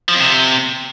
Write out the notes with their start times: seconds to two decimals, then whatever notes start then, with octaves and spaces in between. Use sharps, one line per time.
0.09 F3
0.14 F2
0.20 C3